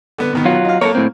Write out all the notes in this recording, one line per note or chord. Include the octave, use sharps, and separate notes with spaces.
D3 B3 B4
B2 D#3 B3
F#3 F4
D#4 F5
F#3 A#3 A4 A#4 C#5
A2 C4